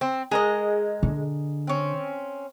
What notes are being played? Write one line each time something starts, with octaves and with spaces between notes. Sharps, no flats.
C4
G#3 G#4 A#4 D#5
D3
C4 C#4